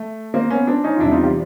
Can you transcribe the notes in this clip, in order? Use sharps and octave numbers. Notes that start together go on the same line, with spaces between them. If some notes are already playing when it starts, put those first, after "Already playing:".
Already playing: A3
A#3 C4
B3 C#4
C4 D4
C#4 D#4
F4
E2 C3 E3 G3 D4 E4
D#4 F4
F4 G4